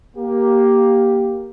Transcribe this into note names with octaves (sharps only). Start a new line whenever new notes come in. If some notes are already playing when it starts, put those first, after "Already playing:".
A#3 G4